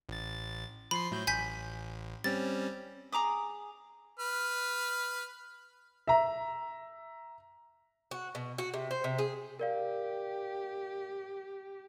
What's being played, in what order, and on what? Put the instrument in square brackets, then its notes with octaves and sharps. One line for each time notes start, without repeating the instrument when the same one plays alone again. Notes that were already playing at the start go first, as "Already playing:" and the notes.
[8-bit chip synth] A1 A6
[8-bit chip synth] F3 C6 C7 [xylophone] B5
[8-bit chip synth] A2 F#3 G6
[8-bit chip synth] A1 [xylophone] G#5 G6 B6
[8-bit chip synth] G3 C4 C#4 [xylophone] A6
[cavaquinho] G#4 A#5 D6 D#6
[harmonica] B4 F6
[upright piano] E5 A#5
[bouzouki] F#4
B2
F#4
C3
C5
C3
G#4
[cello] G4 [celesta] A#4 D5 F5